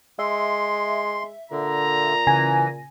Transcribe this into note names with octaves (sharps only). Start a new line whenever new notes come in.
G#3 E5 C6
A#2 D3 A#5
C#3 E3 G#5 A#6